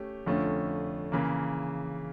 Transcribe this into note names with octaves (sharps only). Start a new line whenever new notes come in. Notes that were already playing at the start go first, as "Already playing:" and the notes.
Already playing: A3 C#4 G4
F2 D3 A3 C#4 F4
C#3 E3 A#3